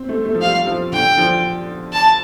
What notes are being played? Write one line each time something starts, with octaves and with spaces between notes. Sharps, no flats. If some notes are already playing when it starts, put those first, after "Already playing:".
Already playing: C4
A3
A3
F3
G3 F5
F3
D3 G5
F3
A5